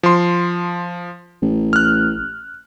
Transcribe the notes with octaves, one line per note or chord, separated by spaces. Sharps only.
F3 C6
A1
F6 F#6